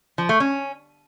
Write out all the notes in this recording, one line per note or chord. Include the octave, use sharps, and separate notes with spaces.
F3
A3
C#4